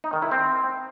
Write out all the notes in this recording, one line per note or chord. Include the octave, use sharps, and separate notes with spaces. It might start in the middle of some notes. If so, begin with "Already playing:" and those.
D#4
D#3
E4
C4